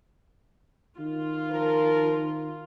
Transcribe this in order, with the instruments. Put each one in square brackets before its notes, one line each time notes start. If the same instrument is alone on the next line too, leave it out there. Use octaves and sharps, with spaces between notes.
[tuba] D#3 [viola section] F4
[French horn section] F3 A#4